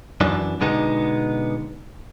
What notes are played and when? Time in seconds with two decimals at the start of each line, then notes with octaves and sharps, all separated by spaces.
0.21 F#2 E3 D4
0.61 B2 D3 G#3 B3 D#4